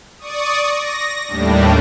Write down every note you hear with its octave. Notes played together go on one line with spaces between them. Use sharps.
D5 C#6 D#6
A#6
D#2 A2 G3 D4